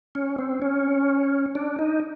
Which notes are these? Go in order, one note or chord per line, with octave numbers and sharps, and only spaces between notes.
C#4
C4
C#4
D4
D#4